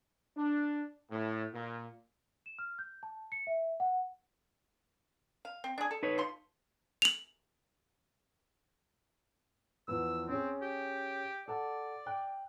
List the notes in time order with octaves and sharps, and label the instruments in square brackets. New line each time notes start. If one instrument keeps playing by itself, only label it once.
[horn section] D4
A2
A#2
[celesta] E7
F6
G6
A5
C#7
E5
F#5
[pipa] F5
C4
D4 G#4
A4
[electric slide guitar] D#4 B4 C#5
[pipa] F3 C6
[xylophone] F7 F#7
[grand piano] E2 F3 B3 [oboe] E6
[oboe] C4 [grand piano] C#4 G#4
[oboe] G4
[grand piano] A4 F#5 A5 [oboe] D5
[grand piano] G5 F#6